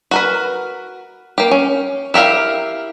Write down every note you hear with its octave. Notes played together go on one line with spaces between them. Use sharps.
F#4 A#4 B4
A#3 G4
C#4
E4 G4 A#4 F5